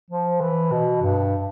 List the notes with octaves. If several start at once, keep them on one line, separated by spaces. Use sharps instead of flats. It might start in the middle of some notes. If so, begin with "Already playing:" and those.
F3
E3
B2
G2